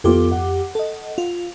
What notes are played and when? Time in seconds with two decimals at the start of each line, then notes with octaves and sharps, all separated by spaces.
0.04 F2 B3 F4 G4 A4 D6
0.32 F#5
0.75 A4 D#5
1.18 F4